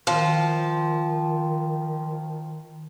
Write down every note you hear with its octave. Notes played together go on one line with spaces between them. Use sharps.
D#3 F3